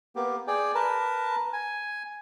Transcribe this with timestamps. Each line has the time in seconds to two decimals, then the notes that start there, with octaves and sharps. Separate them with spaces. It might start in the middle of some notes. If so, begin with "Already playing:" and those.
0.16 A#3 B3 G4
0.47 G#4 D5 G5
0.75 A#4 B4 A5
1.53 G#5